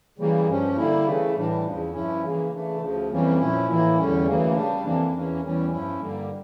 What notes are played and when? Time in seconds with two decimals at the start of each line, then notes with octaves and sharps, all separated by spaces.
0.18 C#3 E3 G3 A#3
0.47 G2 F3 C#4
0.76 D3 G3 A#3 E4
1.05 C#3 E3 A3
1.35 A2 E3 G3 D4
1.64 E2 C#3 F3
1.93 G2 F3 C#4 E4
2.22 C#3 E3 A#3
2.51 C#3 E3 A3 D4
2.80 D2 C#3 F3
3.09 F2 E3 G3 A#3 C#4
3.39 A#2 F3 C#4 E4
3.67 A2 E3 A#3 E4
3.97 E2 D3 G3 C#4
4.26 D2 C#3 E3 A#3
4.55 C#3 G3 D4
4.84 F2 E3 A#3 D4
5.13 E2 E3 A#3 C#4
5.42 E2 E3 G3 C#4
5.71 G2 F3 C#4 E4
6.00 G2 D3 G3 A#3